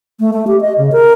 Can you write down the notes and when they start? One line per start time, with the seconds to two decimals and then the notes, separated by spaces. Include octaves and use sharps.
0.20 A3
0.33 A3
0.47 G4
0.61 D#5
0.78 C#3
0.92 A#4